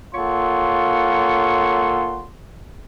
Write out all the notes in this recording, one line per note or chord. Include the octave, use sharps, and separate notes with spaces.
A#3 F4 A4 C#5 F#5 C6